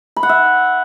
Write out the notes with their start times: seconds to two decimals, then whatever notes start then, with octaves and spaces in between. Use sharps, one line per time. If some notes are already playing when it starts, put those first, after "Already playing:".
0.16 B5
0.23 F#5
0.29 E5